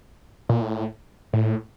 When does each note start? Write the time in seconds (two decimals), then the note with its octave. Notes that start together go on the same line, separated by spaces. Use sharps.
0.49 A#2
0.62 A2
1.33 A2